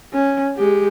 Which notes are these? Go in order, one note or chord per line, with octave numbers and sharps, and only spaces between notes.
C#4
G#3 G4